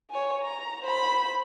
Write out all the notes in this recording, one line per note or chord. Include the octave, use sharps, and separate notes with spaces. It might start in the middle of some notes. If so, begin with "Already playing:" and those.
C#5 G#5
A#5
C5 B5